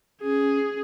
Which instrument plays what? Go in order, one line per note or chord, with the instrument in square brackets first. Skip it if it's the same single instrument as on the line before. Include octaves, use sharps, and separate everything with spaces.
[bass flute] C#4 [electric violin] G#4